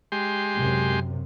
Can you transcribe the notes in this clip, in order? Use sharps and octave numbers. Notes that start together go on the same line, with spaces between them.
G#3 G4 C6
F#2 C3